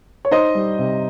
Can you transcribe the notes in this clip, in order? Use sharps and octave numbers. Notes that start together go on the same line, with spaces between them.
C#5
D#4 C5 D#5
G3
C3